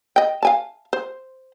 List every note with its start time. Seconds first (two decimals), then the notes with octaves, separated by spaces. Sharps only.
0.16 D#5 G5
0.43 F5 G#5 A5
0.93 C5